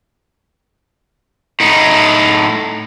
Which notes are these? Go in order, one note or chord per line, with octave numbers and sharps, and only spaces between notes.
A2 D#4